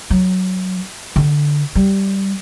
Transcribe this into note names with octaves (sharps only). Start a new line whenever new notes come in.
F#3
D3
G3